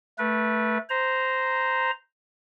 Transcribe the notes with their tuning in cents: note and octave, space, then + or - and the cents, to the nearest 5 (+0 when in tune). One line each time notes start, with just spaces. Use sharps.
A3 +0 B4 -25
C5 -10 A#5 +0